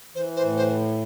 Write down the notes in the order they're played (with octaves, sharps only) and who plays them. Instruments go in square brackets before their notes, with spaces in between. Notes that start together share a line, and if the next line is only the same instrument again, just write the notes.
[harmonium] E3 [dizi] C5
[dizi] C5
[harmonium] A2
[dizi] C5